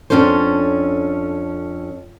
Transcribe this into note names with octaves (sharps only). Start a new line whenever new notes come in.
F2 C#3 C#4 D4 A4 C5